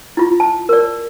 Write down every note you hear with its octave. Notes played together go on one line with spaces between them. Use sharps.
E4 F4
A5
A#4 D5